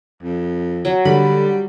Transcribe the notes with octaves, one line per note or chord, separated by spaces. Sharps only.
F2
F#3
D3 G3 B5